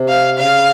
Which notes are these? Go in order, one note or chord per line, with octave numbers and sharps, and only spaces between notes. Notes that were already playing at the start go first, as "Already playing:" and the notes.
Already playing: C3
F5
C#3 F5